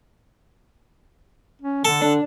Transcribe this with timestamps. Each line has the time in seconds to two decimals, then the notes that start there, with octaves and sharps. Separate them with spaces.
1.62 C#4
1.85 D3 A4
2.02 D3 D4